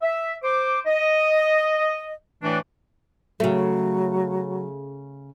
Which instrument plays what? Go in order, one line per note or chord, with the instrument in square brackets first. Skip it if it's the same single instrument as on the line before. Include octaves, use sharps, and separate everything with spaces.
[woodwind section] E5
C5 D6
D#5
A2 E3 A3 D4
[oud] C#3 A3 [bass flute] F#3